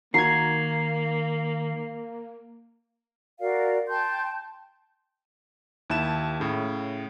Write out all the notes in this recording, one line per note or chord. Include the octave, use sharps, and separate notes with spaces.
D#3 A#3 F#4 A#5 G#6 C7
F#4 A#4 D5 F5
G5 A5 C6 G6
D#2 E4 A5 E7
A2 C#3